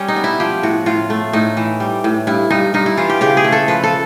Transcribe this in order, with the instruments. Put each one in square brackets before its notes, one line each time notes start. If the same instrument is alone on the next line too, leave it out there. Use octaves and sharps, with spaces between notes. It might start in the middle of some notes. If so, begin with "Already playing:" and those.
Already playing: [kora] G3 C#4
D#4
B3
E4
F3 G4
A2 F#4
A2 F4
A3
A2 D#4
E3
G3
A2
G2 E4
G2 D#4
G2 D#4
E4
E3 F4
G4
C#3 G4
G#4
A3
A4
F3 B4
A4